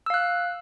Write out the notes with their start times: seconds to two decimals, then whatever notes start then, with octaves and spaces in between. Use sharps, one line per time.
0.06 E6
0.10 F5
0.14 F#6